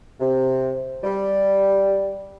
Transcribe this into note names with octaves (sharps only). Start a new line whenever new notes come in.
C3
G3